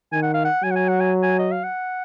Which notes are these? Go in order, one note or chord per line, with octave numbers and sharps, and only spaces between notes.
D#3 G#5
F#5
F5
F#5
F#3 G#5
F#5
G#5
F#5
G#5
G#5
D#5
F5
F#5